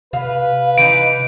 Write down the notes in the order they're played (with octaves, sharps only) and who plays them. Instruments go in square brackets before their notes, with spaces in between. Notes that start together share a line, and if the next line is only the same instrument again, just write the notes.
[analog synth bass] C3 [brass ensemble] B4 [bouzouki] F5
[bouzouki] E3 D#4 [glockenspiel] D7